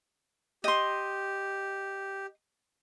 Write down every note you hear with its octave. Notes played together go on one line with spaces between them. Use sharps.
G4 D#5 C6